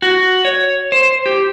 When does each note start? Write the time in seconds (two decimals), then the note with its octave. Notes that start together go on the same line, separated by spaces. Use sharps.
0.02 F#4
0.45 C#5
0.92 C5
1.26 G4